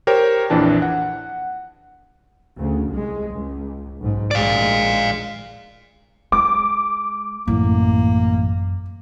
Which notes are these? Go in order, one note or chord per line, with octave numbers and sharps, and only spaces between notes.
G4 A#4 C5 C#5 G5
A#1 F2 E3 D4 A5
F#5
D2 C#3
C2 G#3
C#2
B1 G#2
A#1 D#2 G#3 D5 F5
G#3 D6
A1 F#2 A#3